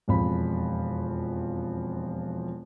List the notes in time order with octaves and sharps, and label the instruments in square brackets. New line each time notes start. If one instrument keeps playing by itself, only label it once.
[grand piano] E1 F2 B5